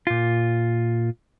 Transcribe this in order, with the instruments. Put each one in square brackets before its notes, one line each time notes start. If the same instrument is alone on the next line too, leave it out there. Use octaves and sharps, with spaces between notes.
[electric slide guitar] A#2 F4